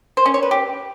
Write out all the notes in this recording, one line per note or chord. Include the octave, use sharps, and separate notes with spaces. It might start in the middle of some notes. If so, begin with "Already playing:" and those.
C5
C#4
C#5
B4
G4